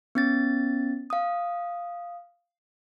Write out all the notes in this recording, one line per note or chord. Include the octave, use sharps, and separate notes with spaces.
B3 C#4 A6
F5 D#6